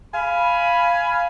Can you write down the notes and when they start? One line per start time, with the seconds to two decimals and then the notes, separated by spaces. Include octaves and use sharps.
0.13 F5 G#5 B5